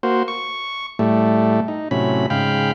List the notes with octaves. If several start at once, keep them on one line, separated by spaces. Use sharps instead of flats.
A#3 F#4 C5
C#6
A2 G3 A3
D#4
A2 C3 F#3 C#4 B5
G#2 C#3 F5 G5 B5